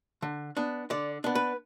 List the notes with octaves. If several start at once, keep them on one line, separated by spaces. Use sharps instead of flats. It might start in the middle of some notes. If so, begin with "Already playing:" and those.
D3
B3 D4
D3 D5
B3 D4
B4